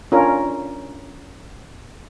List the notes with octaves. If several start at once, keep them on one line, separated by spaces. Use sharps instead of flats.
C#4 D4 F4 A#4